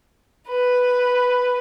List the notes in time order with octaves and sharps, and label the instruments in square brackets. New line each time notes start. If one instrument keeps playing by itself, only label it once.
[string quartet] B4